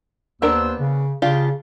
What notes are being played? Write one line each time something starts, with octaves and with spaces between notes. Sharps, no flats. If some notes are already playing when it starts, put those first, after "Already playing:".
D#2 B3 D4 A#4 C5 E6
C#3
C#3 D4 F4 G4